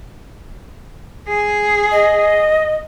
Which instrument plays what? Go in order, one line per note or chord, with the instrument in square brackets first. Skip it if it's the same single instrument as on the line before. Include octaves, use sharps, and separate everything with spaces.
[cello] G#4
[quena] D#5